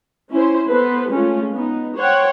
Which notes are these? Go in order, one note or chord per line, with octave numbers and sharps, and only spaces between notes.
C#4 E4 C5
B3 A4 B4 C5
G#3 A3 C#4 F4
B3 D#4
C5 C#5 F#5 G5